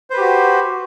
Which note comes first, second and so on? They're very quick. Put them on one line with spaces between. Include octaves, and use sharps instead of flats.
C5 B4 G4 F#4